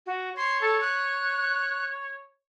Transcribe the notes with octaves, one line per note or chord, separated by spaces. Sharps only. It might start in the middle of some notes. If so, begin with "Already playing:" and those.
F#4
C#5 C6
A4
F#6